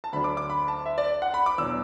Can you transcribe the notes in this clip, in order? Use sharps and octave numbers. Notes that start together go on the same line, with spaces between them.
A5
D2 D3 F#3 D4 B5
D6
D6
B5
A5
E5
D5
F#5
B5
D6
E2 B2 F#3 D4 E6